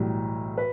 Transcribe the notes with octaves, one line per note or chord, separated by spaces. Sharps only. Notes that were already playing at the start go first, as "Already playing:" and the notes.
Already playing: B1 A2 E3 G3
B4